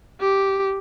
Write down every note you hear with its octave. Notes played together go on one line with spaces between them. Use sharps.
G4